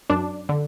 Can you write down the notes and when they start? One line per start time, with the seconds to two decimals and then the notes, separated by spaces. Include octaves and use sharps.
0.10 F#2 D4
0.49 D3